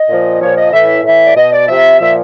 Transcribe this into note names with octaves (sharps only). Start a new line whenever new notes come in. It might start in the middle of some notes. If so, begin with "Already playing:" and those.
Already playing: D#5
A#2 F3
A#2 F3 C#5
D#5
A2 E3 E5
A2 E3 E5
D5
B2 D#5
D5
C3 F3 E5
A#2 F3 E5